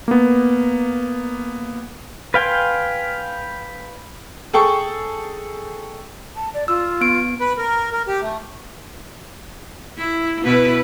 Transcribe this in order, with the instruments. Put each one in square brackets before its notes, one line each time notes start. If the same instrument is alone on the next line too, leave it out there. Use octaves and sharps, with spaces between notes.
[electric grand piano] A#3 B3
[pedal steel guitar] B4 F5 G5 G#5 C6
[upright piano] G#4 A4 G5 C#6
[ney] A5
D5
[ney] F4 [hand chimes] E6
[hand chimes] B3 D7
[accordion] B4
A#4
A#4
G4
A3
[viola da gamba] E4
B2 E4 B4